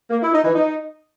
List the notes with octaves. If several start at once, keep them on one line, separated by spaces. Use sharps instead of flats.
A#3
E4
D#4
E3
D#4